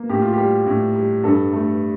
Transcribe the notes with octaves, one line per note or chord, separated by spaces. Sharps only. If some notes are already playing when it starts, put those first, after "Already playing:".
Already playing: A#3
A2 G4
F4
G3 G4
A2
G3
G2 A4
A3